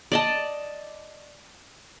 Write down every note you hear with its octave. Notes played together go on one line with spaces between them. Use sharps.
D5 D#5 A5